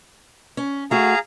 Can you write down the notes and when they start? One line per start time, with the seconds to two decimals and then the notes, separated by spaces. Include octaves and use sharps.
0.57 C#4
0.91 A3 F#4 G#4 F5 A#5